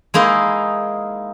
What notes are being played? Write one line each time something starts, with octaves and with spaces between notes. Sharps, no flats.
G#3 A#3 D#4 E4